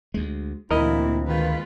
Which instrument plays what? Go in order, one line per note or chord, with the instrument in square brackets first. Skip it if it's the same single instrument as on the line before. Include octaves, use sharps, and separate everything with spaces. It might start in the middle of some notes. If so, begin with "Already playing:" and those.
[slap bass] D2 G#3
[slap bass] D2 [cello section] A#2 E3 C4 [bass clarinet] E4 [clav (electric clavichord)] A#4 D#5
[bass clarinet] D#3 [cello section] G#3 F4 B4